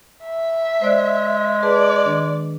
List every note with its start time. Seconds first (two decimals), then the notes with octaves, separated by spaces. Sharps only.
0.23 E5
0.82 G#3 C5 D5 F#6
1.63 G#4 B4 D5 A5
2.06 D#3 D4